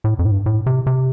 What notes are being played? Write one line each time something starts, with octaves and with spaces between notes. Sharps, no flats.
A2
F2
A2
G2
A2
C3
C3